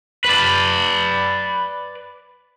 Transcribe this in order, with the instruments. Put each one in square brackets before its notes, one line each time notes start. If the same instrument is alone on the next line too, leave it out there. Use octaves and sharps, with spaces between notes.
[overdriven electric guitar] B4 D5